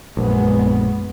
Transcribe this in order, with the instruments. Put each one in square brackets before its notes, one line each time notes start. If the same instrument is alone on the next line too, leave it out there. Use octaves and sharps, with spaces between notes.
[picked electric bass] A#1 [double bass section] F#2 G#3 B3